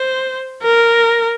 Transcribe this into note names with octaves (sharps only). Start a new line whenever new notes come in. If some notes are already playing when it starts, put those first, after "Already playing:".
Already playing: C5
A#4